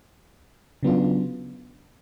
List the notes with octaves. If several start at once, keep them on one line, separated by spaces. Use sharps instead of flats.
C#3 F#3 B3 D4 F4